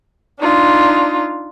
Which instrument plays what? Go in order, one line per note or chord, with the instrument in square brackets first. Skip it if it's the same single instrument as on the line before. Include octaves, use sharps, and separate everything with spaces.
[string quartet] D4 D#4 F4